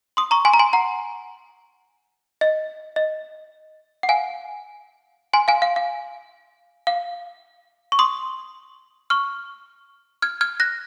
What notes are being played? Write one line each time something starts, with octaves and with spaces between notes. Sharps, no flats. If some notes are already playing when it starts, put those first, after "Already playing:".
C6 D#6
A#5 C#6
G#5 C6
A#5
G#5 C6
F#5 A#5
D#5
D#5
F#5
F5 G#5
G#5 C6
F5 G#5
F5
F5
F5
C#6
C6 D#6
C#6 F6
F6 G#6
F6 G#6
F#6 A#6